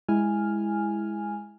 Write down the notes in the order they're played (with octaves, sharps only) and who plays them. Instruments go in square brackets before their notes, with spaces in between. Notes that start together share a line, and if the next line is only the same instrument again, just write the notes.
[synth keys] G#3 E4 G#5 F6